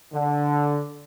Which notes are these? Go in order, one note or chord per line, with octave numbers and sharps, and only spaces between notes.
D3